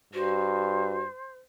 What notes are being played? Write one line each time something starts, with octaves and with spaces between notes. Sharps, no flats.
G2 F#4 C5